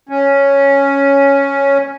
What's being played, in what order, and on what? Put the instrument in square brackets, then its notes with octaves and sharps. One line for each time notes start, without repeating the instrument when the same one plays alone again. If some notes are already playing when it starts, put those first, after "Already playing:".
[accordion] C#4